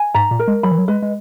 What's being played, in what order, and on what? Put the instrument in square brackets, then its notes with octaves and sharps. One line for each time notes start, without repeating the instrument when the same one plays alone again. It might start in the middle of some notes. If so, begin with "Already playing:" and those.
Already playing: [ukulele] G#5
[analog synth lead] G#2 [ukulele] A#5
[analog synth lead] A#2
[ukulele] A#4
[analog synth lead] G#3
[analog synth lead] F#3 [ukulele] B5
[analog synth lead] E3
F#3
[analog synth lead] G#3 [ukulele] B4
[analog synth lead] G#3